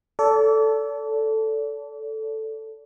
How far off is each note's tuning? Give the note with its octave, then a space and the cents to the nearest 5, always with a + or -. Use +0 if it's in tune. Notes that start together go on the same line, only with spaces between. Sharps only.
A4 +0 D5 -40